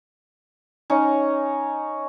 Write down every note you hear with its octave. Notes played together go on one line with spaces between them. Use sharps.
C#4 D#4 C#5